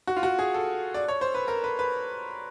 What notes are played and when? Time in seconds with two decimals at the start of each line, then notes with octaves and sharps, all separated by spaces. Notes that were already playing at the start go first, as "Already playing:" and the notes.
0.07 F#4
0.17 F4
0.23 F#4
0.39 G#4
0.54 A4
0.94 D5
1.08 C#5
1.21 C5
1.34 B4
1.48 A#4
1.64 B4
1.79 B4